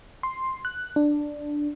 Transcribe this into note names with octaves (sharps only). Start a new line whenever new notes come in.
C6
F#6
D4